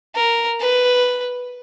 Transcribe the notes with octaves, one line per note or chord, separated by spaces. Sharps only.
A#4
B4